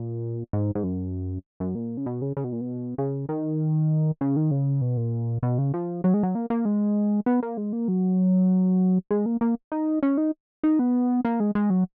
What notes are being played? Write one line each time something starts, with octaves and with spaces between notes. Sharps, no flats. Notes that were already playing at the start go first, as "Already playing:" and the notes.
Already playing: A#2
G#2
G#2
F#2
F#2
A#2
C#3
B2
C#3
C#3
B2
A#2
B2
C#3
D#3
C#3
D#3
C#3
B2
A#2
B2
C#3
F3
F#3
G#3
F#3
A#3
A#3
G#3
B3
A#3
G#3
A#3
F#3
G#3
A#3
A#3
D#4
C#4
D#4
D#4
B3
A#3
G#3
G#3
F#3